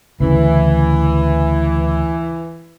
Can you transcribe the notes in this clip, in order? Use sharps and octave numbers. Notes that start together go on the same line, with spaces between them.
D2 C#3 E3